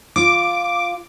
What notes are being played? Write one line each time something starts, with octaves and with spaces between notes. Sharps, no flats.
F4 D6